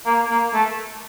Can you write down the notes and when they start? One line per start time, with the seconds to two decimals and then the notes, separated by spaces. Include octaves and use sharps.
0.06 A#3
0.30 A#3
0.54 A3